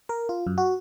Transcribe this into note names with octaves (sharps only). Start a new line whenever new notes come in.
A#4
F4
F#2
F#4